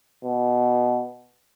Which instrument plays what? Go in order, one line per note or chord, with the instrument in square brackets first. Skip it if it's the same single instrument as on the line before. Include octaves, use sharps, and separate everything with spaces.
[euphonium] B2